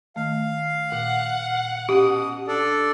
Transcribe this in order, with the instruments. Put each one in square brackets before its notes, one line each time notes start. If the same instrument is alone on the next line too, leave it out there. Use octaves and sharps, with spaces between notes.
[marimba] D#3 A3 [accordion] F5
[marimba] A#2 [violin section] F#5
[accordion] B2 D#6 [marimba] C#4 [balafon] G4
[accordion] D4 A4 D5